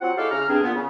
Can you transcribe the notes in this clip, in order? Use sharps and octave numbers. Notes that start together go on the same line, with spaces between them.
F#3 C4 F4 C5 F#5
G#3 E4 G4 A4 C#5 F5
C#3 A#5 F6
G2 C4 D4 G#4
A#2 B3
C#3